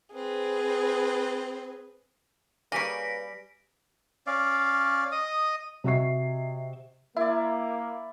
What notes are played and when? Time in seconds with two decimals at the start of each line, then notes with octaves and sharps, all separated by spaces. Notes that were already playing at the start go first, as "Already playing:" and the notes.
0.14 C4 G#4 B4
2.72 C#3 G3 A#3 B4 G#5 A#6 B6 D7
4.27 C#4 D5 F5
5.12 D#5 D#6
5.84 C3 F#4 D#5 E5 C#6 C7
7.17 A#3 E4 D5 E5